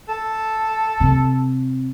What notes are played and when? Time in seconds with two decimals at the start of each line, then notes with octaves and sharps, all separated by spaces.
0.09 A4
1.00 C3